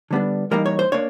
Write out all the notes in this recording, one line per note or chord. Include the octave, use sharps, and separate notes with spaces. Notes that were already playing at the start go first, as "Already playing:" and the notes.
D3 G3 B3 D4
E3 G3 A#3 D#4 A#4
C#5
C5
A#3 D4 C#5